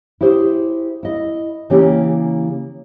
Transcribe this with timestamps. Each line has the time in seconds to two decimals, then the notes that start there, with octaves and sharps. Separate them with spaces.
0.21 E4 G4 G#4 C5
1.03 E4 D#5
1.70 C#3 E3 A#3 C#4 G4 G#4